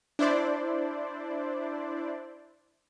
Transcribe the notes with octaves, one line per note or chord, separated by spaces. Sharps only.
D4 E4 C5 D5